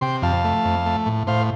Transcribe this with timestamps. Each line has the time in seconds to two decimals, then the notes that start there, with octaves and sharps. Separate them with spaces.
0.01 C3 G5 C6
0.22 F2 F5 A5
0.44 A3
0.65 F2
0.86 A3
1.06 A2
1.27 A2 C5 F5